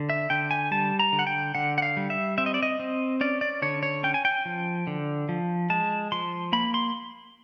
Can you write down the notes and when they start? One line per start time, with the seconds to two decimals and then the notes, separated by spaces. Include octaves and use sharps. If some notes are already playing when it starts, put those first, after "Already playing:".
Already playing: D3
0.10 E5
0.30 D3 G5
0.51 G#5
0.71 G3 A5
0.99 A#5
1.12 D3
1.19 F#5
1.27 G5
1.55 D3 F#5
1.78 F#5
1.82 F5
1.97 G3
2.10 E5
2.38 C4 E5
2.46 D#5
2.54 D5
2.63 D#5
2.79 C4
3.21 C#4 D5
3.41 D5
3.62 D3 C#5
3.83 C#5
4.03 C#4 G5
4.14 G#5
4.25 G5
4.45 F3
4.87 D3
5.29 F3
5.70 G#3 A5
6.12 F3 C6
6.53 A#3 B5
6.74 C6